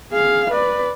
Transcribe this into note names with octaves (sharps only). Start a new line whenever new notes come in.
G#4 F5
B4 D5